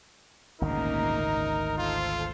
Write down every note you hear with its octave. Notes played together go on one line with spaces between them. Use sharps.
G#1 D2 A#2 C#3 A#3 D#4 A#4
F4 A4 C5